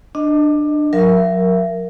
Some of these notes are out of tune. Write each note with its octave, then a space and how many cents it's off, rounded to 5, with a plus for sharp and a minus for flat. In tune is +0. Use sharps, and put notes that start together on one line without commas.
D4 +20 D#5 +0
F#3 -30 A#4 +0 E5 +25